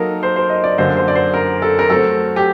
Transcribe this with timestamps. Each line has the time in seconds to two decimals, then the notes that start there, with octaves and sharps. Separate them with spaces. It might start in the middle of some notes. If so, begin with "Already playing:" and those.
Already playing: F#3 A#3 D#4 A4 A#4
0.23 C5
0.36 C5
0.50 D#5
0.64 D5
0.78 F#2 D3 F#3 A#3 C5
0.97 C5
1.08 D5
1.15 C5
1.34 A#4
1.62 A4
1.79 A#4
1.90 F#3 A3 C4 A4
2.36 G4